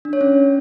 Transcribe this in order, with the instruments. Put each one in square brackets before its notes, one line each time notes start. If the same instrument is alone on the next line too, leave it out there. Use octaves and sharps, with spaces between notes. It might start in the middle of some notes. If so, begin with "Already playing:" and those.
[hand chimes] D4
C#5
C#4